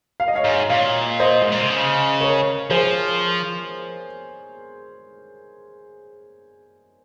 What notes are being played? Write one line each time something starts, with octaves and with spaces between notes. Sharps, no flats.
F5
D#5
C#5 F5
G#2
A#2 C#5 F5
C5 D#5
G#2
A#2
C3
C#3
A#4 C#5
F3 G#4 C5